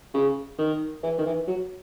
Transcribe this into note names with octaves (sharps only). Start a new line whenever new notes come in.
C#3
D#3
E3
D#3
E3
F#3